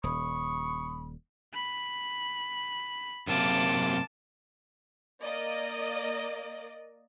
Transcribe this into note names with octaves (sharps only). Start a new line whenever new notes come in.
D#1 B5 C#6 D#6
B5
F#2 C3 A#3 A5 D6
A#3 D5 D#5